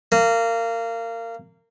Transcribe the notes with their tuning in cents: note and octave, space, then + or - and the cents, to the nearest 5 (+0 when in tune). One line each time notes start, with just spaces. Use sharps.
A#3 -25